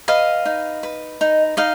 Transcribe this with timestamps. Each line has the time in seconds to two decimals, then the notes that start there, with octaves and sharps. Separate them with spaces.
0.08 B4 D#5 F5
0.45 D#4
0.83 B4
1.21 D#4
1.57 D#4 D#5 F5